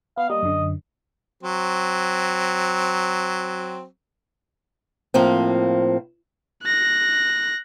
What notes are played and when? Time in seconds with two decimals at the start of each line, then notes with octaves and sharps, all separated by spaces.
0.18 B3 F5
0.30 G3 A#3 D#5
0.42 F#2 D3
1.43 F#3 C4
5.14 A2 F3 A#3 C4
6.63 F#6 A#6